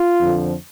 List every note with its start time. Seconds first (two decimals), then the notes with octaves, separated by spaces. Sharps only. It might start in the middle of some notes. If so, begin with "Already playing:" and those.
Already playing: F4
0.20 F2 D3 F3